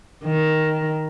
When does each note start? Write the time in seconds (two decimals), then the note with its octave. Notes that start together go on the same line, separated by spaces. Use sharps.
0.24 D#3